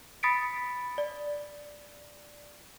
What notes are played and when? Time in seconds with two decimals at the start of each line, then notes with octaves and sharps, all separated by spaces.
0.23 B5 D#6 A6 B6 C#7 D7
0.98 D5